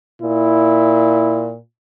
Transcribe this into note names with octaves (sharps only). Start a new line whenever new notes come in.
A#2 E4